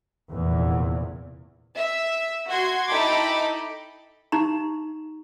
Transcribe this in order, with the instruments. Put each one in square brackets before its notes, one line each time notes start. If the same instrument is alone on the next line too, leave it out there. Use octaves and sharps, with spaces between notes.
[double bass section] F1 E2 A#2
[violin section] E5
F#4 C6 G#6
D#4 E4 A4 G5 B5 D6
[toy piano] D#4 G4 A#5